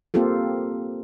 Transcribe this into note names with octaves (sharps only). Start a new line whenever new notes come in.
A#3 C4 F4 G4 A4